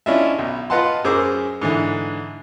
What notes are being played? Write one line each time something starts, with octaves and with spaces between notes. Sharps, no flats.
C#4 D4 E4 F4 D#5 E5
B1
F4 B4 D#5 F#5 A5 C6
F#2 G#4 A#4 C5 D6 E6
G#2 D3 E3